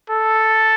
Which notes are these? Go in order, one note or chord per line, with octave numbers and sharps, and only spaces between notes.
A4